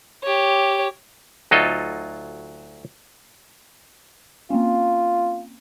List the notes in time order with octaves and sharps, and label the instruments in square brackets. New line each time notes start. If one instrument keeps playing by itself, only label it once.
[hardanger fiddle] G4 C#5
[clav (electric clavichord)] D2 F#3 D#4 F4 A4 D#5
[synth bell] A#3 C4 C#4 [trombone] F4